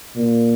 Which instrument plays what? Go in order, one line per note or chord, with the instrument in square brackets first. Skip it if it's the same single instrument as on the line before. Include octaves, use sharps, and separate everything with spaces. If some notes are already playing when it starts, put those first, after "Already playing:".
[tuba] A#2